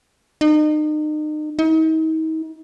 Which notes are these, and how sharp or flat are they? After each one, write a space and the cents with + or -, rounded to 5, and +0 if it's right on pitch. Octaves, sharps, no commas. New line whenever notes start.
D#4 -35
D#4 +40